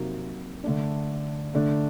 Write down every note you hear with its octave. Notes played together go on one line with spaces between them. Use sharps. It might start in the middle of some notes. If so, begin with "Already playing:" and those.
Already playing: C3 F#3 A#3 D#4
D3 A3 D4
D3 A3 D4